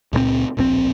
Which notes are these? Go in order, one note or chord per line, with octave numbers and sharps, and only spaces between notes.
C#2 A#2 G3 C4
D1 A#1 A#2 C4